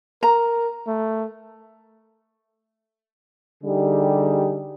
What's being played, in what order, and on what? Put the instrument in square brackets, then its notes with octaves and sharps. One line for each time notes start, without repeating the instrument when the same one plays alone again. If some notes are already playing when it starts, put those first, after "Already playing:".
[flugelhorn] A#4 [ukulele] A#5
[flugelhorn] A3
[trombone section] D3 G3 D#4 G4 G#4